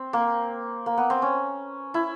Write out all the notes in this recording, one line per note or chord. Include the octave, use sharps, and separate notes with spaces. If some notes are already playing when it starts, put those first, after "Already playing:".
Already playing: C4
A#3
A#3
B3
C4
C#4
E4